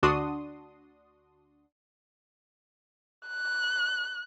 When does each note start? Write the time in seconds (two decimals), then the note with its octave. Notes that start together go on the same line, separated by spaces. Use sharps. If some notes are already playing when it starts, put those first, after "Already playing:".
0.03 D2 D4 F#4 C6 D#6
3.27 F#6